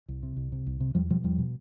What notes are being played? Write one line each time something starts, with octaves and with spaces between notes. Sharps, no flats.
C2
C3
C2
C3
C2
C3
E2 F3 G3
B2 F3 G3
E2 F3 G3
B2